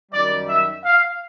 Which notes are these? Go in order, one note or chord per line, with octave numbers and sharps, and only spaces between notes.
F#2 D#3 G3 D5
E5
F5